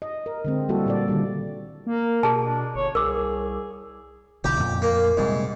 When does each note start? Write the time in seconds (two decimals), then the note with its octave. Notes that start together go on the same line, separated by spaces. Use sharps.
0.02 D#5
0.26 A#4
0.45 D3 G#3 C4
0.69 G3 A#3 E4 F#4 A4
0.86 A#2 A4 D5
1.08 D3 D#3 G3
1.87 A#3 A#4
2.23 B2 G#4 A5
2.43 D4
2.75 G1 C#5
2.95 C2 G#4 A#4 D6
4.44 B1 D3 E3 G4
4.60 F2 A#2
4.82 A#3
5.17 G#2 C3 G3 A#3